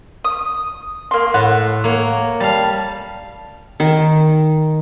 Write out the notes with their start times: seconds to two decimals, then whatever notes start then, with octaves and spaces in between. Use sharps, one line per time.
0.25 D#6
1.11 A#3 C6
1.34 A2 F#5
1.84 A#3 C#5
2.40 G3 F5 A5
3.80 D#3